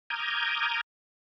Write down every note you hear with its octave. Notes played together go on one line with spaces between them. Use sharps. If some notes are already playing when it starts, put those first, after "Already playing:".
A#5 D6 D#6 F6 G6 G#6